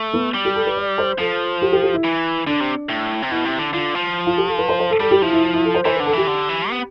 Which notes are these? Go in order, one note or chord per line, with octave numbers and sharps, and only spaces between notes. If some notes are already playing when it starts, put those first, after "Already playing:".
Already playing: A3
B3
G3
G4
A4
B4
D5
C5
F3 A4
G4
G4
G4
E4
E3
D3 D4
C3
A2
C3
B2 E4
C3
D3
D3 F4
F3
F4
G4
A4
B4
C5
C5
A4
G3 A4
G4
F3 E4
E4
E4
E4
A4
C5
E3 C5
B4
D3
A4
E3 G4
D3
E3
B3